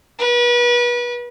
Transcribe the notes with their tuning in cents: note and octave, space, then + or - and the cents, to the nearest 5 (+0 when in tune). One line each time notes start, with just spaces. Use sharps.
B4 -35